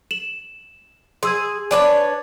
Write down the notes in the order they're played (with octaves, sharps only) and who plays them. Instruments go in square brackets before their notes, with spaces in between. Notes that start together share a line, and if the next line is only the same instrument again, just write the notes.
[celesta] E7 F#7
[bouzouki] G#4 [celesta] C6 E6 G#6
[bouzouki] D4 B4 C#5 [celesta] G#5 D6